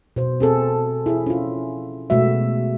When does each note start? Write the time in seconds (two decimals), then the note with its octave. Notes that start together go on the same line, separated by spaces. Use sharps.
0.16 B2 C5
0.40 C4 G#4 A4
1.06 E4 G#4 E5
1.26 C#4 F4
2.10 B2 G#3 A3 F#4 E5